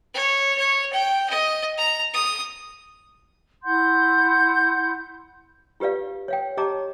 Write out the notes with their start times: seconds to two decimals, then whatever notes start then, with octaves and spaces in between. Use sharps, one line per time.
0.14 C#5
0.58 C#5
0.93 G5
1.30 D#5
1.78 A#5
2.14 D#6
3.63 E4 F#5 C6 G6
5.80 F4 G4 B4 D5 F5
6.28 C#5 F5 G5
6.57 G4 C#5 D#5 A5 A#5 D6